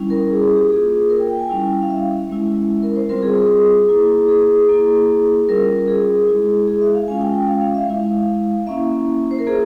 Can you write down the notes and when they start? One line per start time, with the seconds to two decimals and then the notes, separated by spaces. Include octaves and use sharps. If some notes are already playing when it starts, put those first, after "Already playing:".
Already playing: G3 C#4 E4
0.10 A#4
0.30 G#4
0.43 G#4
0.56 G4
0.70 A#3 F4 G#4
1.10 A#4
1.19 G5
1.30 G5
1.39 G#5
1.49 G3 C#4 E4 G5
1.82 F5
1.90 E5
2.29 G#3 C#4 E4
2.83 A#4
2.96 C5
3.09 G3 C4 F4 A#4
3.22 G#4
3.36 G#4
3.89 A#3 E4
4.29 G#4
4.69 A#3 E4
5.48 G3 C#4 F4 A#4
5.88 G#4
6.28 G#3 E4
6.68 G#4
6.82 E5
6.94 F5
7.08 G#3 C#4 F4 G#5
7.21 G5
7.34 G5
7.48 F5
7.61 F5
7.74 E5
7.87 G#3 E4 F5
8.67 A#3 C#4 E4 E5
9.31 C5
9.39 A#4
9.47 A#3 F4 G#4